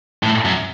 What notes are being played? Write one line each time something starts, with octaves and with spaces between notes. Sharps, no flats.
A2
F#2